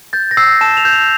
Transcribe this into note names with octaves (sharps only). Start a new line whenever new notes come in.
G6 A6
A#6
E6 C7
A5 E7
F7
G6
F7